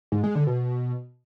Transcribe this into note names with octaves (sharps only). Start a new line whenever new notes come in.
G#2
G#3
D3
B2